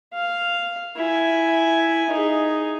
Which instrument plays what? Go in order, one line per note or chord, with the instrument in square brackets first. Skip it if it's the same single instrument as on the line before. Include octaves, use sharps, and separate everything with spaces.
[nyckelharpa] F5
E4 G#5
D#4 G#4